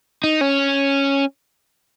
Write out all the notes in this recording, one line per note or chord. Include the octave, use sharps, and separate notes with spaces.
D#4
C#4